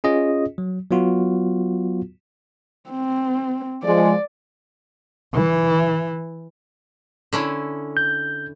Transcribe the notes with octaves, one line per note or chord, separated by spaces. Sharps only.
C#4 F4 G#4 D#5
F#3
F#3 B3 F4 F#4
C4
F3 G#3 D5
E3
D3 C#4 E4
G6